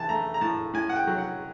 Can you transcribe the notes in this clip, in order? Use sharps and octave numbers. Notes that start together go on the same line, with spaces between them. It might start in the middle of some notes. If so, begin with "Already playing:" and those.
Already playing: E3 A5
A3 A#5
A#5
A2 A5
A2 G#5
F#5
G5
F#3
F#5